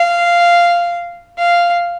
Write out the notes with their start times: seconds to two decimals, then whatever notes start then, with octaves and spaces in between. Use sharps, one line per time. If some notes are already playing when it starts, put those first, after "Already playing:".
Already playing: F5
1.38 F5